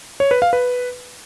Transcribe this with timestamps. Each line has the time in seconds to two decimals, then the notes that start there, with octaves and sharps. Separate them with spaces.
0.20 C#5
0.31 B4
0.42 F5
0.53 B4